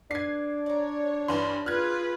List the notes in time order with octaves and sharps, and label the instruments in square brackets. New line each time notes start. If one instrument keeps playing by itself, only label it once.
[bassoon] D4 [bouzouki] B4 [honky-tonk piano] G#6 C7
[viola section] C#5 [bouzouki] D5 A#5
[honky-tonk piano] G2 E3 C6
[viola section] F4 G#4 B4 [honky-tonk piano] F6 F#6 G#6